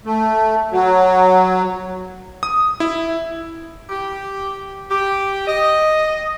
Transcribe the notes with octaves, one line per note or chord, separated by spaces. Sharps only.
A3
F#3
D#6
E4
G4
G4
D#5